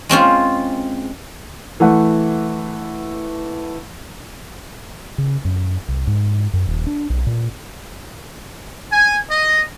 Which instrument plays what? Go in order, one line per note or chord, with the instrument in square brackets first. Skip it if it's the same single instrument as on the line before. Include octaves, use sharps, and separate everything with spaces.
[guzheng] G#3 C4 C#4 F4
[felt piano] E3 A3 F#5
[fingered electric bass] C#3
F#2
C2
G#2
F#2
D#1
D4
B1
A#2
[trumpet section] G#5
D#5